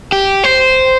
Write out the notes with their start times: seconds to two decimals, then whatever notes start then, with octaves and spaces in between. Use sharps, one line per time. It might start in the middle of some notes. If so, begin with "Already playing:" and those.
0.12 G4
0.44 C5